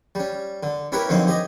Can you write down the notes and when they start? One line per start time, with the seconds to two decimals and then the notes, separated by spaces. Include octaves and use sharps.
0.15 G3 C#4
0.63 D3
0.92 C#4 E4 G4 A#4 B4 C#5
1.09 F2 D3 F#3 A#3 C4 D#4
1.28 G4 D#5 G#5